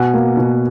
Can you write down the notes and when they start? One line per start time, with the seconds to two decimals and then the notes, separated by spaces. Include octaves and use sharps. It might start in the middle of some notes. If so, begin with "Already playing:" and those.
Already playing: B2 F#5 G#5
0.14 A#3
0.37 B2